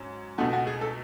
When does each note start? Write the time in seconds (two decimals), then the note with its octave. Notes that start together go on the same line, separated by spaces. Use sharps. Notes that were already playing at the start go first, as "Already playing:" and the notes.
Already playing: G#2 F#3 C#4
0.38 C#2 B2 A3 D#4 F#4
0.53 F#4
0.67 G#4
0.81 A4